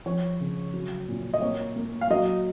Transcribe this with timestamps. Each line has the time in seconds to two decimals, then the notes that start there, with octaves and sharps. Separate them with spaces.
0.06 F3 C#5
0.41 C#3
0.74 F#3
1.09 A#2
1.34 D#5
1.42 A#3 C#5
1.76 A#3
2.01 F5
2.10 F#3 D#5